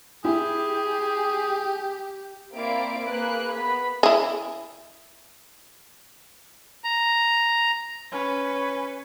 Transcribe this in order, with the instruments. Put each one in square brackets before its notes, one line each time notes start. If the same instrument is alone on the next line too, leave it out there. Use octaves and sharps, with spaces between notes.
[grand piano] E4 [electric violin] G4 [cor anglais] G#4
[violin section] A#3 C4 E4 D5 F5 D7
A#3 G#4 B4 F#6
B3 B5
[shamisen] E4 G#4
[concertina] A#5
[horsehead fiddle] C#4 B4